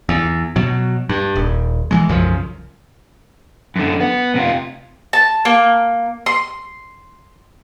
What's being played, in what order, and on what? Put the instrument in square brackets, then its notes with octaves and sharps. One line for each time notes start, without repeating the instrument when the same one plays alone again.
[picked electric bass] E2
B2 F#3
G2
D#1
E3 F#3 G#3
B1 F#2 C#3 F3
[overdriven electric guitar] F#2 D3
B3
C3 F4
[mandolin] A5
A#3
C6